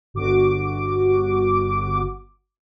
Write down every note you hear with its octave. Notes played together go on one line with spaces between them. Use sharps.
G1 F#4 D6